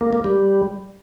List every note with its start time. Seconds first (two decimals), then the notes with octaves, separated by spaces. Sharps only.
0.01 A#3
0.13 A#3
0.24 G3